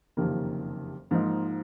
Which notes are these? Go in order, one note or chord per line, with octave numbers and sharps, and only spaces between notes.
F#1 F2 C3 D#3 A#3
G#2 F3 A#3 D#4